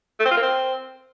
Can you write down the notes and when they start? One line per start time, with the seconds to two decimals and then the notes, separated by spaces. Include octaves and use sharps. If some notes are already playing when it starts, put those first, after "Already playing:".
0.20 A3
0.26 C4
0.31 F4
0.37 A#3
0.43 C4